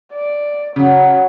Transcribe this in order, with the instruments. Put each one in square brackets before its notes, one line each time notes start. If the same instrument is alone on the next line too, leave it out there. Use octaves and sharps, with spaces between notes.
[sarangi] D5
[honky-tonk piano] C#3 [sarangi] F#3